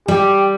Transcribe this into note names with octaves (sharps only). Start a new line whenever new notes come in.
G3 G4